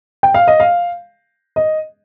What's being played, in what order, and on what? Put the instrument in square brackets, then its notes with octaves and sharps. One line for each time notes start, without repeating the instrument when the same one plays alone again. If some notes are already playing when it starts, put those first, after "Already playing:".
[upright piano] G5
F5
D#5
F5
D#5